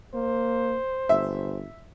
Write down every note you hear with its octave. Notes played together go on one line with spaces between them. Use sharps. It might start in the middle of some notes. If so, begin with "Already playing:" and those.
A#3 C5
G1 E5